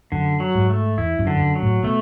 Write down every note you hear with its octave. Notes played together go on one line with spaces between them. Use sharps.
F#2 D3
F#3
G#2
A3
E2 E4
F#2
D3
F#2
F#3
A2
B2 A3